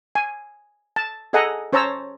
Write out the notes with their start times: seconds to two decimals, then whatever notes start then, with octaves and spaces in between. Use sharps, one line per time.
0.15 G#5
0.96 A5
1.33 G#4 A4 D#5 F#5 G#5 A#5
1.73 C#4 C5 C#5 A5 A#5 E6